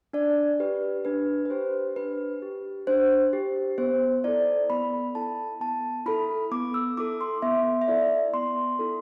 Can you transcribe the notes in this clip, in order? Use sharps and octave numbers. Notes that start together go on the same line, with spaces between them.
D4 D5
G4 B4
D4 B4
B4
G4 C5
D4 B4
G4
D4 C5
G4
B3 C5
E4 A4 D5
B3 B5
E4 A4 A5
B3 A5
E4 A4 B5
B3 D6
E6
E4 A4 D6
C6
B3 E5
E5
E4 A4 D5
B3 C6
E4 A4